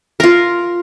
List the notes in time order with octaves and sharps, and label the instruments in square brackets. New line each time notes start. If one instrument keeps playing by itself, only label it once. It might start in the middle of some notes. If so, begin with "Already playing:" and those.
[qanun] F4 A#4